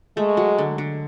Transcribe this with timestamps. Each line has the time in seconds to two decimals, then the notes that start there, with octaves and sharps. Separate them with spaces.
0.17 G#3 A3
0.37 F#3
0.58 D3
0.78 D3